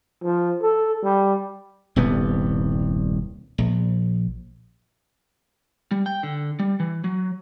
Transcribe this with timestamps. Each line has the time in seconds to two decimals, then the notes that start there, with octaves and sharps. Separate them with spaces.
0.23 F3
0.62 A4
1.03 G3
1.96 D#1 C2 G2 B3
3.58 A#1
5.91 G3
6.06 G5
6.23 D3
6.59 G3
6.80 E3
7.04 F#3